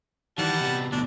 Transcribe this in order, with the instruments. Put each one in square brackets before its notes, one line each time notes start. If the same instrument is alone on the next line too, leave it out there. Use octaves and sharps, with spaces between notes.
[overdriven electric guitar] D#3 E3 [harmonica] G3 F#5 A5
[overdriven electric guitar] C3 B3
[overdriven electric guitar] D2 B2 [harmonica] D4